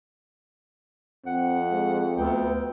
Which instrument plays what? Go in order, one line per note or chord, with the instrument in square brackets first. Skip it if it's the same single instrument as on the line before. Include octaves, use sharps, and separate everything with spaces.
[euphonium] F2 [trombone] C4 [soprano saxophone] F#5
[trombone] G#3
[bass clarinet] D2 [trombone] B3 [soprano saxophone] G5